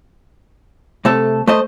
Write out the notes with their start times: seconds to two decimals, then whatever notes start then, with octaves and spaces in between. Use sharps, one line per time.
1.05 C3 A3 A4
1.48 A3 C5 D#5